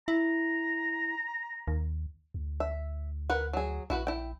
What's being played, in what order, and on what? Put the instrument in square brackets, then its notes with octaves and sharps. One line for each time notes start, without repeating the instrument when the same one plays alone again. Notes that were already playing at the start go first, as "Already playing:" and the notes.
[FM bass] E4 [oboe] A#5
[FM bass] D#2
[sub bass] D2
[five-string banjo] E5
A#4 B4 F#5
F#3 G#4
[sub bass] A#1 [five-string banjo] E4 F#4 B4
[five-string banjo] E4 G5